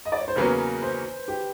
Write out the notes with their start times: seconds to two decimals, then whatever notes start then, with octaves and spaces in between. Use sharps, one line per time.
0.05 D#5
0.12 D5
0.20 C#5
0.28 C5
0.36 E2 C#3 F#3 A#3 C#4 B4
0.82 C5
1.28 G4